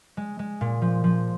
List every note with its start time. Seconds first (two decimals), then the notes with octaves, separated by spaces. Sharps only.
0.17 G#3
0.39 G#3
0.61 A#2
0.82 F3
1.04 F3